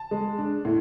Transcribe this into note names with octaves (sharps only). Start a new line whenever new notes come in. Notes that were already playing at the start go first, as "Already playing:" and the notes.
Already playing: A5
G#3
D4
A2